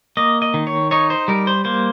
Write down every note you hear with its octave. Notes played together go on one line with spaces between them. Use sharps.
A#3 D#5
D#5
D#3
C#5
D#4 C#5
C5
G3 A#4
C5
A#3 C5